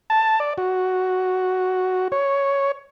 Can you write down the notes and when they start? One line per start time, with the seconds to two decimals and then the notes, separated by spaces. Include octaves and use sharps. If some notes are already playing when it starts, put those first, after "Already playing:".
0.10 A5
0.40 D5
0.58 F#4
2.12 C#5